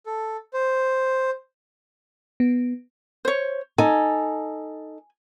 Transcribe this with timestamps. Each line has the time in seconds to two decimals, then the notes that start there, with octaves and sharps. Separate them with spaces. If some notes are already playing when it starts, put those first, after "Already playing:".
0.06 A4
0.53 C5
2.40 B3
3.25 C5 C#5
3.78 D#4 A4 G#5